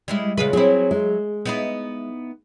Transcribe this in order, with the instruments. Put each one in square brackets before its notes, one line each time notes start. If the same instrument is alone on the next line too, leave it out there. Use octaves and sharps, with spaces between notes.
[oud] G3 G#3 E4
[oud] C#3 F4 B4 [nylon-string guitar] G#3
[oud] F#3 E4 [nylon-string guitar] C4 G#4
[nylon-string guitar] G#3
[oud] B3 D#4 E4